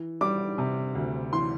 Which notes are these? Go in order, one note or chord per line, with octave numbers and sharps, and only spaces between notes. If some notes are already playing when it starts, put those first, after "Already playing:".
Already playing: E3
G3 D6
C3
D2
E3 C6